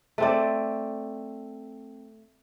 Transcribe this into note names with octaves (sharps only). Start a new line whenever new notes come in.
A3 C4 D5